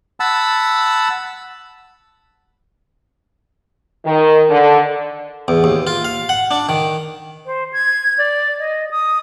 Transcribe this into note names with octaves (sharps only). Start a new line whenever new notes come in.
F#5 A5 B5 E6
D#3
D3
E2
D#2
F4
F5
F#5
D4
D#3
C5
G#6
D5
D#5
D#6